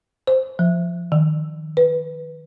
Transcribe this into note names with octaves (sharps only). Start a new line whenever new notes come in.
C5
F3
D#3
B4